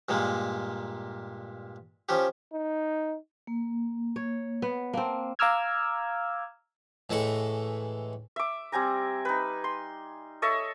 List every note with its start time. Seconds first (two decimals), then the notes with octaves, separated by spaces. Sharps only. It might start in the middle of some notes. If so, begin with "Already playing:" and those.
0.09 G2 A#2 G#3 A#3
2.09 F3 C#4 G4
2.53 D#4
3.47 A#3
4.16 C#5
4.62 B3
4.93 A#3 C4 A5
5.39 F5 A#5 D6 E6 F6 G#6
7.10 A2 E3 G#3 C#6
8.36 E5 D6
8.72 G3 C4 G#5 A#5
9.25 D#4 B4
9.64 C6
10.42 A4 C#5 D#5 E5